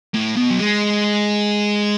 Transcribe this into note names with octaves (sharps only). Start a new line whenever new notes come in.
A2
B2
F#3
G#3